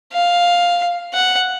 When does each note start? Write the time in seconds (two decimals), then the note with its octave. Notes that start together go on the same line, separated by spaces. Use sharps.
0.13 F5
1.14 F#5